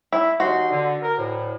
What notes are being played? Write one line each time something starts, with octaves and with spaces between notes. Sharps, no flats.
E4
D#2 D#4 F#4 C6
D3
A#4
D2 A2